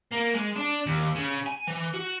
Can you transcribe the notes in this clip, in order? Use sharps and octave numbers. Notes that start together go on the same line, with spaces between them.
A#3
G#3
D4
D#2
C#3
G#5
E3
F#4